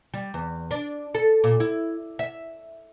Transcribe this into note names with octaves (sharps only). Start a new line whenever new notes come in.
G3
E2
D4
A4
A#2
E4
E5